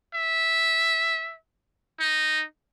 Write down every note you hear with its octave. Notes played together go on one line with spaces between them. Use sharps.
E5
D#4